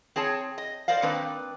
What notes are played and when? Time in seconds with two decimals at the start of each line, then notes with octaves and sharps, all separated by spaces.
0.16 C4 G#4 C#5 A5
0.58 D#5
0.88 A#4 C5 D5 D#5 F5
1.02 D#3 A#3 C4 D4 B4